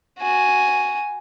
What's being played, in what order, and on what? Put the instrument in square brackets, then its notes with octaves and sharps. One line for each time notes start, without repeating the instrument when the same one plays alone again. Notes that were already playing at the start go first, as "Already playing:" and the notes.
[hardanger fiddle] F#4 G#5